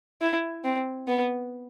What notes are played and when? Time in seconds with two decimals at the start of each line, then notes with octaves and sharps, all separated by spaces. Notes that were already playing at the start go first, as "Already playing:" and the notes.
0.22 E4
0.64 C4
1.08 B3